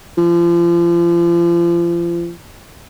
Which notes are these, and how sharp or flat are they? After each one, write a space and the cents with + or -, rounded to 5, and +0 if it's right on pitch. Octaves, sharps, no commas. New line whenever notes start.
F3 -35